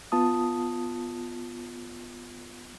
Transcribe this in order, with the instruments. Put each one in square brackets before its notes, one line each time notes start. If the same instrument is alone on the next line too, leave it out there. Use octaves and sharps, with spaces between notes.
[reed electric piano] B3 F4 A5 D#6